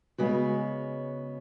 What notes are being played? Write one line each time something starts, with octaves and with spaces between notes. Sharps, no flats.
C#3 G#3 B3 F#4 C#5